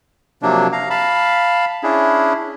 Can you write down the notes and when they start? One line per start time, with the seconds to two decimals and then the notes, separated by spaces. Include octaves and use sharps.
0.42 C3 F3 F#3 A#3 D4
0.72 F5 A#5
0.90 F5 A5 B5
1.83 C#4 D4 E4 G#4